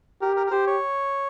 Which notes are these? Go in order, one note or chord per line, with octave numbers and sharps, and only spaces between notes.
G4 A#4
A#4
A#4
G4 C5
C#5